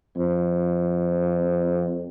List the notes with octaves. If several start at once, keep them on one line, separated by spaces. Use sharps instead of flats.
F2